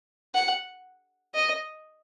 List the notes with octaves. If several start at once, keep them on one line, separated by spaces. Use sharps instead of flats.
F#5
D#5